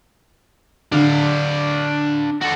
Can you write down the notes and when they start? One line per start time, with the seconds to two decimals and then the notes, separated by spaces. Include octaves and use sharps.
0.92 D3 D4 F5
2.42 F#4 A4